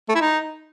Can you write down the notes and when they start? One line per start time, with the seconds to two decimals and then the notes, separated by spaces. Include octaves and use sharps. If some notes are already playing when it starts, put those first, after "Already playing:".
0.09 A3
0.15 E4
0.21 D#4